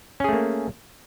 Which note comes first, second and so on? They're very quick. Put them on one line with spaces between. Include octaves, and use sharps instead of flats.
C#4 G#4 A3 A#3